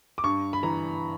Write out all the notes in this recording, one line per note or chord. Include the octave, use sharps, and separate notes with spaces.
D6
G2 C#6
B5
E3 A#5